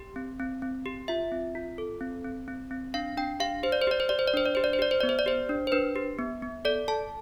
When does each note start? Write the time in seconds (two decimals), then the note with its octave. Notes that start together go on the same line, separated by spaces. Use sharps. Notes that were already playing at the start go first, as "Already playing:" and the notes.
Already playing: G4
0.16 C4
0.40 C4
0.62 C4
0.86 G4
1.08 F4 E5
1.32 C4
1.55 F4
1.78 A4
2.01 C4
2.25 C4
2.48 C4
2.71 C4
2.94 D4 F5
3.17 D4 G5
3.40 G4 F5
3.63 G4 C5
3.72 D5
3.82 C5
3.87 G4 D5
4.00 C5
4.09 G4 D5
4.19 C5
4.28 D5
4.34 D4 C5
4.45 D5
4.55 G4 C5
4.64 D5
4.73 C5
4.79 G4 D5
4.91 C5
5.01 B3 D5
5.09 C5
5.19 D5
5.26 G4 C5
5.49 D4
5.67 C5
5.72 D4 B4
5.96 G4
6.19 B3
6.42 B3
6.65 A4 D5
6.88 A4 A5